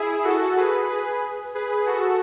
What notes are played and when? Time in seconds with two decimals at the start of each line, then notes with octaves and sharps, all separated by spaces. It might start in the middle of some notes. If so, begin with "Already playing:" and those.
Already playing: E4 G#4
0.24 F#4 A4
0.57 G#4 B4
0.89 G#4 B4
1.55 G#4 B4
1.86 F#4 A4